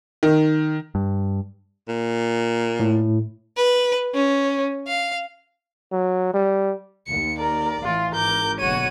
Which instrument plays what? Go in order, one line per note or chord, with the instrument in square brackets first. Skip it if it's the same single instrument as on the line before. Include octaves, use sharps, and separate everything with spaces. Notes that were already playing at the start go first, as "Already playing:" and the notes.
[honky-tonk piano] D#3
[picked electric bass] G2
[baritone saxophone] A#2
[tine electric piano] A2
[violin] B4
C#4
F5
[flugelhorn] F#3
G3
[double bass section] D#2 [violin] C#7
[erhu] A#4 [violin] D5
[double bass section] A1 E3 [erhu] F4
[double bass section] G#1 [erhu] A#4 [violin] D6 G6
[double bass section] F#1 B2 D3 [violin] F#4 D#7 [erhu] C#5